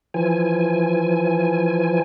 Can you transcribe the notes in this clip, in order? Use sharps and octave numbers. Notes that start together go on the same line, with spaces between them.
E3 F3 G#5